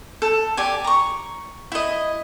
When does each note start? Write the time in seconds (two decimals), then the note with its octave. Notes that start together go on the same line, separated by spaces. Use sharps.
0.22 A4
0.57 G4 D5 G#5
0.85 A#5 C#6
1.72 E4 D#5